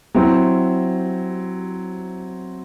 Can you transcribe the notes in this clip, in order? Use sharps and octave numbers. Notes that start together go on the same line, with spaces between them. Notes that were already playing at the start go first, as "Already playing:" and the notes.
F#3 C4 E4